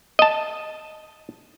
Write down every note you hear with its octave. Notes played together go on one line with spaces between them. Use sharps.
D#5 A5